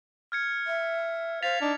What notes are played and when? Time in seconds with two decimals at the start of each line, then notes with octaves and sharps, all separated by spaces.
0.32 F6 G#6 C#7
0.67 E5
1.43 C5 F5 A6 B6 F7
1.61 D4 D#4